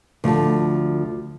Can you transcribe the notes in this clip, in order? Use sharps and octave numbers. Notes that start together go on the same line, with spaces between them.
D2 F3